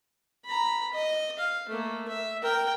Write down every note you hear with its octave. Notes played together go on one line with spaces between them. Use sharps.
A#5 B5
D#5
F5
A3 A#3
E5
A#4 G5